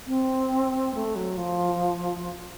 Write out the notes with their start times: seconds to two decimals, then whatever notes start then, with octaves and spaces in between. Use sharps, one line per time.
0.07 C4
0.95 A3
1.16 F#3
1.37 F3